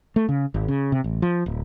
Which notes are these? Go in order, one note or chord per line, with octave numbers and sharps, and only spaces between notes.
A3
C#3
G#1
C#3
C3
A1
F3
D1